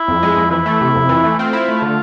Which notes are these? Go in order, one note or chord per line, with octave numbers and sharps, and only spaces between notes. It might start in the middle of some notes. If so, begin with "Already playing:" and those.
Already playing: E4
F2
G#3
F2
E3 E4
A3
C3
F2
E3
A3
C4 F4
E4
A3
D3